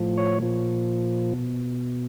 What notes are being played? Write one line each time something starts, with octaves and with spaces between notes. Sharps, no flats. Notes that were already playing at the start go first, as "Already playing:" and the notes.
Already playing: A2 F3
C#5
A#2 F3
B2